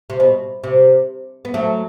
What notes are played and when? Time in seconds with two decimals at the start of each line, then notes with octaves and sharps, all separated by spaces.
0.10 C3
0.20 B2
0.64 C3
1.45 B3
1.54 F#3 A3